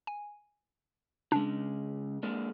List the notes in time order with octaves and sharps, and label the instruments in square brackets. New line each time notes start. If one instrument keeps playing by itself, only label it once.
[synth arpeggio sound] G#5
[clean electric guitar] C#3 G#3 [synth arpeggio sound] D4
[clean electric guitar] G#3 A#3 D4